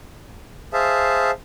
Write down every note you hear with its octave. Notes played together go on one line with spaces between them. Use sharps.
G#4 C5 E5 F5 A5